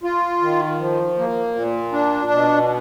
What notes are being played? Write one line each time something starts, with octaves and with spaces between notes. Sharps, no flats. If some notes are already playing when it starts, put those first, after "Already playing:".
F4
D#3
F3
A#3
A#2
D4
B2